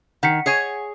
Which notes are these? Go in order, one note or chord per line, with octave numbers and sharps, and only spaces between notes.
D#3 F#5 B6 C#7
G#4 C#5 G#5